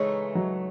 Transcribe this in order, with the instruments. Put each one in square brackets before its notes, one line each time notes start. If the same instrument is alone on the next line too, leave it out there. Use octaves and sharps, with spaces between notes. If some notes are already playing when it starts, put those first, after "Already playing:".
Already playing: [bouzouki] C#3 E3 A3 D#4 [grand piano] G#3
[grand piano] F#3